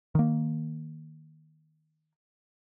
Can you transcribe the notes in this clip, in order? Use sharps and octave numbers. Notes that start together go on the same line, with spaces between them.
D#3 A#3